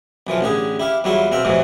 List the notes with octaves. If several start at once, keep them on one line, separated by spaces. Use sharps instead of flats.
B1 E3 F3 F4
A1 D3 G4 G#4
E4 G4 F5
E2 F#3 G3 E4 F4 C6
B2 C4 E5 F5 G5
F2 A2 C3 E3 F#3